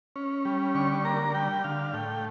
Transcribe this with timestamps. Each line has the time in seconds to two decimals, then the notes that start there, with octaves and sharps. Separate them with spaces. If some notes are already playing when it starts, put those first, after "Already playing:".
0.16 C#4
0.45 G3
0.75 D3 C#6
1.05 A#3 A#5
1.34 G3 G5
1.64 D3 F5
1.94 A2 G5